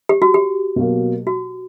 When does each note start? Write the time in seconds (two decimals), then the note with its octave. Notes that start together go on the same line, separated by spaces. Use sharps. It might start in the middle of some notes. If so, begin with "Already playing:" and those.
0.09 G4
0.22 F#4
0.34 G4
0.76 B2 F#3 A#3
1.27 F#4